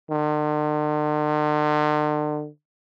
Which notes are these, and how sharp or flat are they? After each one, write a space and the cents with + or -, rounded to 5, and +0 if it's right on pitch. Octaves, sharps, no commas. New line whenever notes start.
D3 +45